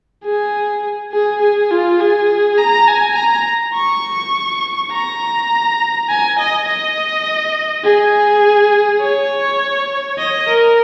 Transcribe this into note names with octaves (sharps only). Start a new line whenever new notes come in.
G#4
G#4
G#4
F4
G#4
A#5
G#5
A#5
C#6
A#5
G#5
D#5
D#5
G#4
C#5
D#5
A#4